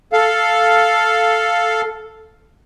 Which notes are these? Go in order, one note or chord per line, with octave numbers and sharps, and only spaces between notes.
A4 F5